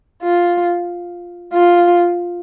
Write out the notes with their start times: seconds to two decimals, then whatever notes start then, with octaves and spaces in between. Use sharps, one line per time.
0.22 F4
1.53 F4